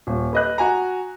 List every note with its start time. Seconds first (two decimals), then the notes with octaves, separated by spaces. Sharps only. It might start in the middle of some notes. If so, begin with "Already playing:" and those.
0.07 D#1
0.33 B4 D#5 F#6
0.58 F#4 G#5 A#5